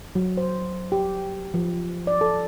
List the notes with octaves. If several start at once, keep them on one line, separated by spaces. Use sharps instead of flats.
F#3
C5
G4
F3
D5
A4